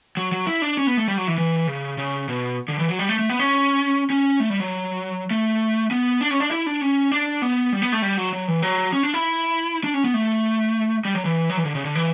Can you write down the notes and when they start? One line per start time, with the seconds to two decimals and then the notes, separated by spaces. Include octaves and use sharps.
0.17 F#3
0.32 F#3
0.47 E4
0.62 D4
0.77 C#4
0.87 B3
0.97 A3
1.08 G3
1.17 F#3
1.27 E3
1.38 E3
1.67 C#3
1.98 C#3
2.29 B2
2.68 D3
2.79 E3
2.89 F#3
2.99 G3
3.09 A3
3.19 A3
3.30 B3
3.39 C#4
4.10 C#4
4.40 A3
4.50 G3
4.60 F#3
5.31 A3
5.91 B3
6.21 D4
6.31 C#4
6.40 D4
6.51 E4
6.66 D4
6.81 C#4
7.12 D4
7.42 B3
7.73 G3
7.82 B3
7.92 A3
8.02 G3
8.17 F#3
8.33 F#3
8.48 E3
8.62 F#3
8.93 C#4
9.03 D4
9.14 E4
9.84 D4
9.94 C#4
10.04 B3
10.14 A3
11.05 G3
11.15 F#3
11.25 E3
11.50 F#3
11.57 E3
11.65 D3
11.75 C#3
11.85 D3
11.95 E3